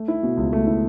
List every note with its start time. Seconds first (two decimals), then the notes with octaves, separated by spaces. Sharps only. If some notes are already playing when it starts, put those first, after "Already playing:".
Already playing: A3
0.08 E4
0.23 B2
0.37 C#2
0.53 A3
0.67 E4